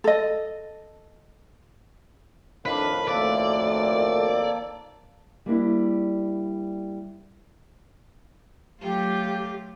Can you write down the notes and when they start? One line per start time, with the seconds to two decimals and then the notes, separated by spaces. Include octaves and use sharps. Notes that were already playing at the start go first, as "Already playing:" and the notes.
0.04 A4 D#5
2.66 F2 A2 D#3 D4 B4 F5
3.08 D2 A#3 A4 D5
5.46 G3 A#3 D4 E4
8.82 F#3 A3 F4 G4